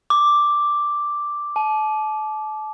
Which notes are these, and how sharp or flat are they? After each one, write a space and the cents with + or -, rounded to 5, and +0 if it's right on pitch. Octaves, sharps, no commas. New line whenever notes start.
D6 +0
A5 -35